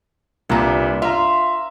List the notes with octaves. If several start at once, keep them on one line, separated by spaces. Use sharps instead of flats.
C2 A#2 B3 D4 A#5
F4 E5 A#5